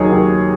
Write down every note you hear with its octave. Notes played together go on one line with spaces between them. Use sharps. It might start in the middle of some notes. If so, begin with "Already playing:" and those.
Already playing: D#2 D#3 F#3 G#4 C#5
D#2